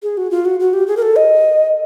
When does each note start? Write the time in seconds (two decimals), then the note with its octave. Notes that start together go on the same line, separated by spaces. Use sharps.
0.03 G#4
0.17 F#4
0.31 F4
0.45 F#4
0.60 F#4
0.73 G4
0.88 G#4
0.97 A#4
1.02 A4
1.16 D#5